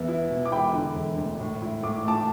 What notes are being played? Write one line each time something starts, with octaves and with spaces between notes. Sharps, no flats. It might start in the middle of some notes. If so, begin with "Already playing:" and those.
Already playing: E2 B3 E5
E4
B2
D6
E1 G5 B5
D3
E1
D2
A2
E4
A2 D6
A3 A5 D6